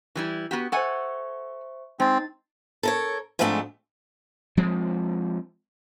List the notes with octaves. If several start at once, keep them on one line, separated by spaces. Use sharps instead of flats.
E3 G3 E4
B3 F#4 G4
A4 C5 E5 F#5 G#5 C#6
G#3 C4 D#4 A6
A4 A#4 C#5
G#2 F3 G#3 A3 C4 D4
F3 G#3 C4